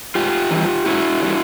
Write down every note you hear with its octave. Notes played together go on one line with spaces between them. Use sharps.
G#2 F4 G4
E3 G3
G#2 E4 F#4
E3 G3